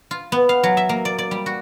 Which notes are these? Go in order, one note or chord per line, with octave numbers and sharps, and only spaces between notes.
F4
B3
F5
F#3
E5
A#3
D5
D5
G3
F#4